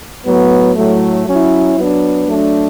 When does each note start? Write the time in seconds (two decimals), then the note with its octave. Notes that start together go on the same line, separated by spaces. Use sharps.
0.26 A2 F#3 B3
0.76 A2 F#3 A3
1.27 F#3 C#4 E4
1.77 F#3 B3 D4
2.28 F#3 A3 D4